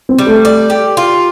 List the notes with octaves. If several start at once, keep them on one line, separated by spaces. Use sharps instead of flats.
C4
G3
A3
D5
G4
F4